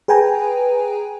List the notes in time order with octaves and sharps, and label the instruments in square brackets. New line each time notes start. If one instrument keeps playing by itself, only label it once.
[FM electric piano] G#4 B4 G5 G#5 A#5